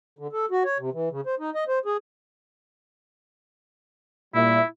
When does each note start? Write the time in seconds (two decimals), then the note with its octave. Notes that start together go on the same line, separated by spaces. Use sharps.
0.19 D3
0.33 A4
0.51 F#4
0.65 C#5
0.79 C3
0.93 E3
1.11 C#3
1.26 C5
1.40 D#4
1.55 D#5
1.68 C5
1.85 G#4
4.35 A#2 G3 E4 E5